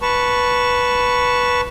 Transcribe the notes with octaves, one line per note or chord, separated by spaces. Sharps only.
B4 A5 C#6